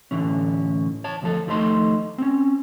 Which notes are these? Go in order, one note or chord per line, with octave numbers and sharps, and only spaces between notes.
A2 D3 E3 C#4
C#5 A5
D2 F3 A4
D#2 F3 A3 D#4 C6
C4 C#4